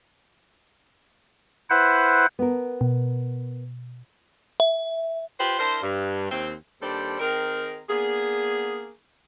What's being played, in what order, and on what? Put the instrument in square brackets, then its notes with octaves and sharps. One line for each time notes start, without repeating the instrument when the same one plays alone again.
[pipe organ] E4 B4 C5 F#5
[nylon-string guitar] B3 A#4
[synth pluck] B2
[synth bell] E5
[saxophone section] F4 G4 B4 C5
D4 E4 A#4 C5
G2
D#2 C4
D#2 G3 C4 D4 A4 C5
D#3 C4 G#4 A#4
A#3 B3 D4 G#4